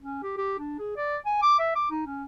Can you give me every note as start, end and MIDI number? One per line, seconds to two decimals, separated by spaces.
0.02 0.23 61
0.23 0.37 67
0.38 0.58 67
0.59 0.76 62
0.79 0.96 68
0.97 1.17 74
1.26 1.38 80
1.42 1.57 86
1.59 1.75 76
1.75 1.87 86
1.91 2.06 63
2.06 2.25 61